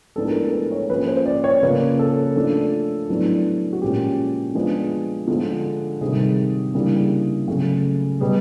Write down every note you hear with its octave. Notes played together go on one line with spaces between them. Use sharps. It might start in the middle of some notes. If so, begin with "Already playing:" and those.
A2 F3 G#3 B3 D4 A4
A#4
A4
B4
C#5
F3 A#3 C#4 B4
C5
D5
C#5
C#3 F3 A#3 C#4 B4
A4
F3 A3 D4
A2 F#3 B3 D4
F#4
A#2 F3 G#3 C#4 G4
F3 G#3 B3 D4
D3 F3 G#3
C3 D#3 G3 G#4
C#3 E3 G3 A#3 D4 G#4
C#3 F#3 A3
B2 G3 B3 G#4